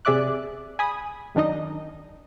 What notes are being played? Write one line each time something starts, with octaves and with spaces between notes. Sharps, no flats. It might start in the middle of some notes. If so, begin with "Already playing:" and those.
C3 G#4 D5 E5 D6 F#6
G#5 B5 D#6
F#2 D#3 D4 D#4 D#5